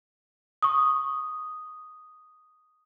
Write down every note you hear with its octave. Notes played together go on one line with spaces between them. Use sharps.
C#6 D#6